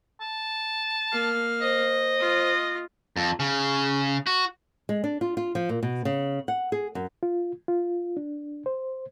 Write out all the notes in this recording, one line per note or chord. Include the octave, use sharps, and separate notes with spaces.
A5
A#3 F5
C5 D#5
F4
F2
C#3
F#4
G#3
D4
F4
F4
F3
A#2
B2
C#3
F#5
G#4
F#2
F4
F4
D4
C5